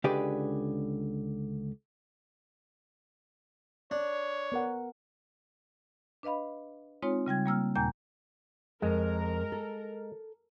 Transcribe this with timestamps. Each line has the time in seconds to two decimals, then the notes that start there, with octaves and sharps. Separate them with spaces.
0.04 C#2 D3 G4 G#4 B4 D5
3.91 D4 C#5
4.52 B3 A#4 F#5
6.23 D4 B4 D#5 F5 B5
7.02 G#3 C4 D#4 F4 C#5
7.26 C#3 G3 G5 G#6
7.45 G3 A#3 E6 F6
7.75 D#2 A#2 G#5 A#5 G6
8.82 F2 G#3 A#4
9.52 A4